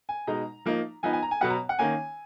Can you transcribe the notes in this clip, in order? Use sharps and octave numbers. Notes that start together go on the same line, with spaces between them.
G#5
B2 G#3 D#4 A#5
F3 A#3 D#4
F3 B3 D#4 G#5
G#5
A#5
G#5
B2 F#3 B3 F#5
A#5
F#5
D#3 A#3 C#4 G#5